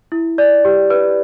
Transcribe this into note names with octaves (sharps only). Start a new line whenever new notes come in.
E4
D5
G4
B4